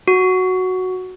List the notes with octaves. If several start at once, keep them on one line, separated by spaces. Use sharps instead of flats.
F#4